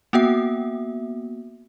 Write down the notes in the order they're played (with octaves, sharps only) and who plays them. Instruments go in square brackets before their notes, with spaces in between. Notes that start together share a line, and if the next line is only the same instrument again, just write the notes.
[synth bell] A#3 B3 F#4 E5